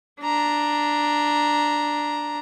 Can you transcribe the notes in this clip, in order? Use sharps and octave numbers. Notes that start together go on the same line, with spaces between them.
D4 A#5